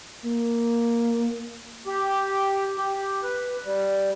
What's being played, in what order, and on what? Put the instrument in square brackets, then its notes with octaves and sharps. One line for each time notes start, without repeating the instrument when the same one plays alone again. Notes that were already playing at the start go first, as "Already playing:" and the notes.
[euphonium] A#3
[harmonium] G4
G4
B4
G3